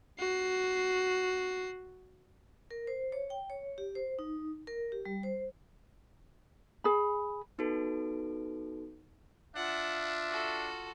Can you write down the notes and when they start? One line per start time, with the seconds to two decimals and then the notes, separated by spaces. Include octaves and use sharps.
0.19 F#4 C7
2.71 A#4
2.87 C5
3.12 C#5
3.30 G5
3.50 C#5
3.78 G4
3.95 C5
4.19 D#4
4.67 A#4
4.92 G4
5.05 G3
5.23 C5
6.84 G#4 B5
7.58 B3 D#4 F#4 A4 B4 D7
9.56 D4 F4 E5 F#5
10.29 F#4 A4